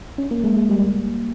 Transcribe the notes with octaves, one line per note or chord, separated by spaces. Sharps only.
C#4
A#3
G#3
G#3
G3